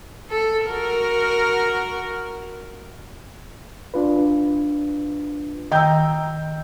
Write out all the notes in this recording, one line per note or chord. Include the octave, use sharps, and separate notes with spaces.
A4
F#4 A#4
D4 F4 B4
D#3 D#5 G5 A#5 E6 G6